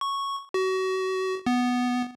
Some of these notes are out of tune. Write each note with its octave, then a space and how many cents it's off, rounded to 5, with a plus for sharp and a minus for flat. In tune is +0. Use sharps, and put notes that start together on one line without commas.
C#6 -5
F#4 +30
B3 +0